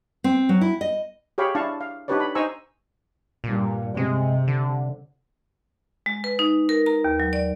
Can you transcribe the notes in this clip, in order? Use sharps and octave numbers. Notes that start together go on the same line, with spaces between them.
C4
F#3
E4
D#5
G4 G#4 C#5 F5 G5 B5
D4 E4 F5 A5 C#6
F5
D4 D#4 G4 B4 C#5 D5
B5
D#4 C5 G#5 A#5 C#6 E6
G2 A#2
C3 G#3
D3
G#3
B4
D#4
A#4
A#5
D#2
F#3
D5